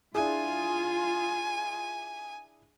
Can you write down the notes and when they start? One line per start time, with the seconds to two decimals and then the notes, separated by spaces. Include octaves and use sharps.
0.15 D4 E4 F4 G#4 G#5